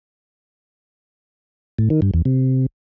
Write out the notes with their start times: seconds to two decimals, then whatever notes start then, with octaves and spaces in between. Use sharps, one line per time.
1.79 A2
1.90 D#3
2.02 G2
2.14 E2
2.25 C3